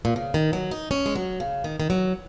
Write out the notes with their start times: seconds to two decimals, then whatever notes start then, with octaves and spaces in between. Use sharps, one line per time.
0.05 A#2
0.16 C#3
0.34 D#3
0.53 F#3
0.71 D#4
0.91 C#4
1.06 G#3
1.16 F#3
1.40 C#3
1.64 D#3
1.80 D#3
1.90 F#3